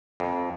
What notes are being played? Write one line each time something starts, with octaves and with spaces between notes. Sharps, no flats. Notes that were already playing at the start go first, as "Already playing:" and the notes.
F2